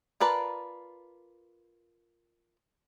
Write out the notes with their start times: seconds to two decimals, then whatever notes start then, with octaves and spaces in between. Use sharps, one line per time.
0.20 F4 A#4 B4 D5 A5